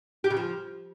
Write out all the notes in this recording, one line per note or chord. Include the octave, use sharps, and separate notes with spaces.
G4
C#3
F3